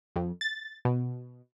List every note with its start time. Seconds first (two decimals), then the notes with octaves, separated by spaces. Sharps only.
0.16 F2
0.41 A6
0.85 B2